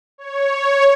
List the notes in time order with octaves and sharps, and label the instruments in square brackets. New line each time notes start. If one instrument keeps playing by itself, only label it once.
[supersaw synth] C#5